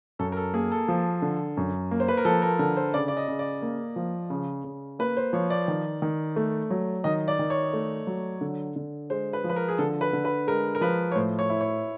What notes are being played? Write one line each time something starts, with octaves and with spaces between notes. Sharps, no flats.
F#2 A4
A#4
A4
A#3 G#4
A4
F3
D3
F#2
A#3
C5
B4
A#4
F3 A4
A#4
D3 A#4
C5
C#3 D5
D5
D#5
C#3
D5
A#3
F3
C#3
C#3
A#3 B4
C5
F3 C#5
D5
D#3
D#3
A3
F#3
D#3 D#5
D5
D#3
C#5
A3
F#3
D3
D3
G#3 C5
B4
F3
B4
A#4
G#4
D3 A4
B4
D3
B4
G#3 A#4
A#4
F3 B4
C#5
A2 C5
C#5
E4
C#5